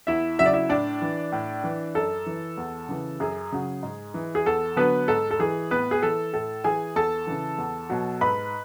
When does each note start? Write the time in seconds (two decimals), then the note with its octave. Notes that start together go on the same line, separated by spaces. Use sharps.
0.07 E2 E4 E5
0.39 C#3 F#3 E5
0.46 D5
0.53 E4 E5
0.69 A2 D4 D5
1.02 E3
1.32 A2
1.64 E3
1.95 F#2 A4
2.26 E3
2.57 E2
2.89 C#3 E3
3.20 F#2 G#4
3.52 C#3 F#3
3.83 G#2
4.14 E3
4.35 G#4
4.46 E2 A4
4.76 D3 F#3 B3 B4
5.08 G#2 A4
5.31 A4
5.39 E3 G#4
5.71 A2 B3 B4
5.91 G#4
6.03 E3 A4
6.33 A2 A4
6.64 E3 G#4 G#5
6.96 E2 A4 A5
7.27 C#3 E3
7.58 E2
7.90 B2 F#3
8.21 G#2 B4 B5